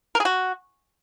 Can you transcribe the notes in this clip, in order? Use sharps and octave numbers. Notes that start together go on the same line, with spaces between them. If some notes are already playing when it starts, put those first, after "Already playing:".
A#4
G#4
F#4